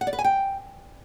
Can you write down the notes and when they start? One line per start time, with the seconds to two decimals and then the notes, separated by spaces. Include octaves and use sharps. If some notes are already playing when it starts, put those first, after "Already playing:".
0.01 F#5
0.07 D5
0.13 B4
0.19 G#5
0.24 G5